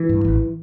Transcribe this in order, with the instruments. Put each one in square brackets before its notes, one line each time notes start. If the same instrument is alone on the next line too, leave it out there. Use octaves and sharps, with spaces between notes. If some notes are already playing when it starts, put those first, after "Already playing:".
Already playing: [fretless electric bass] E3
G2
A1